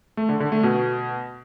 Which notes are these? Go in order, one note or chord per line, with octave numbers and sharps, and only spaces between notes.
A3
D3
D3
A3
B2